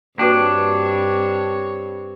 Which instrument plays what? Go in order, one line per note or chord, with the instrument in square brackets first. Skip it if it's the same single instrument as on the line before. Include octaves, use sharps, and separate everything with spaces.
[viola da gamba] G2 C4 [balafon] A#3 F#4 B4 [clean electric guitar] D4 [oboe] C#5